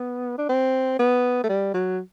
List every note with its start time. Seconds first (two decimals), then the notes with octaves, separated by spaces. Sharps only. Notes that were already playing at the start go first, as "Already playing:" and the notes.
Already playing: B3
0.38 D4
0.49 C4
0.99 B3
1.44 A3
1.49 G3
1.74 F#3